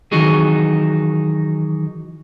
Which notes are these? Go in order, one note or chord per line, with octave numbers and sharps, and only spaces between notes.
D#3 E3 F#3 D#4 F#4 G#4